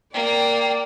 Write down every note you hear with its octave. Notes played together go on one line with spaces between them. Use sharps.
A#3 D5 G5